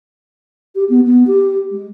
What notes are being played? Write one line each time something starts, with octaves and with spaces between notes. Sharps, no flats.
G4
B3
B3
G4
G#3